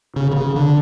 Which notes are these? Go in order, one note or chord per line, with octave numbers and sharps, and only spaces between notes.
C#3
D3
C#3
D3